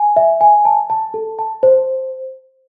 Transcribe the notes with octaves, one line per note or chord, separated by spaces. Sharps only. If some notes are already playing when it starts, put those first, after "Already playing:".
Already playing: G#5
E5
G#5
A5
A5
A4
A5
C5